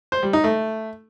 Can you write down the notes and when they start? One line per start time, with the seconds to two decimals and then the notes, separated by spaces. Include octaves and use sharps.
0.12 C5
0.23 G3
0.33 D#4
0.44 A3